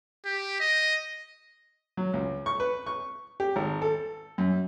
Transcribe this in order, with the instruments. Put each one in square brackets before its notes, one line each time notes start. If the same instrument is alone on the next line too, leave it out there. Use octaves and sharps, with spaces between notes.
[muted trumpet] G4
D#5
[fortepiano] F#3
C#2
C#6
B4
C#6
G4
G#1
A4
F#2